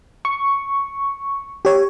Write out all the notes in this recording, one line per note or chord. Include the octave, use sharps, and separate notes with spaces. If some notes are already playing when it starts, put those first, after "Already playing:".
C#6
G4 C#5